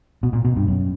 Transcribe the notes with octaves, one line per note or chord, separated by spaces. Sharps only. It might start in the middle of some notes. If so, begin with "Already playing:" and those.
B2
A#2
B2
G2
F#2